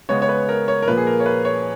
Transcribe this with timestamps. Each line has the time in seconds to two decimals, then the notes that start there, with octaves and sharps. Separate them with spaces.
0.09 C#3 G#3 B3 C#5
0.22 C#5
0.29 B4
0.49 A#4
0.68 C#5
0.82 A#4
0.87 A#2 F3 A#3 B4
0.97 G#4
1.07 A#4
1.20 C#5
1.26 B4
1.45 C#5